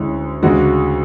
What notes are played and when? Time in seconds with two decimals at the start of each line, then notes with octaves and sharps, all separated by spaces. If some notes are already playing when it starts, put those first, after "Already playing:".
Already playing: D2 D3 G#3 C#4 E4
0.43 D2 C#3 G#3 D4 F#4